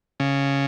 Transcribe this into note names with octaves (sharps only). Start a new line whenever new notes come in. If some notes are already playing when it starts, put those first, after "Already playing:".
C#3